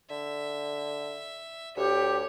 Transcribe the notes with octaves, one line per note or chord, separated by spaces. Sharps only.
D3 E5
D2 G4 C#5